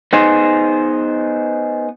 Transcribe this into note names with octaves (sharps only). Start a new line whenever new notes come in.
B3 D#4 G#4 C5